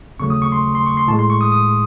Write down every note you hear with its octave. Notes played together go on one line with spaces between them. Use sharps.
D#2 C#3 F#3 A3 C#6
D#6
C#6
C6
C6
C#6
C6
A2 G#3 A5
C6
C#6
D#6
D#6